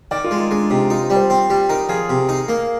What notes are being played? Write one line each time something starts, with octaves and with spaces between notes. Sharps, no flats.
D#3 D5
F4
G#3
D#4
G#3 D4
C3 D#4
D#4 F4
C5
G3
C5
C4
G3
D#4 A#4
F3 G#4
C3
D#4
A#3